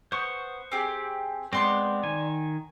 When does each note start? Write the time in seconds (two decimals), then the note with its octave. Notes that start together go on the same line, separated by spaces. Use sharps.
0.12 B3 C5 C#6
0.72 C4 G4 G#4
1.53 G#3 B3 C4 D5 C6 C#6
2.03 D#3 G#5